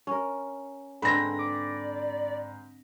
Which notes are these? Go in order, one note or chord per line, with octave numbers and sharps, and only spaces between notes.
C#4 A#4
G#2 D3 G#3 C4 B4 B5 A#6
D5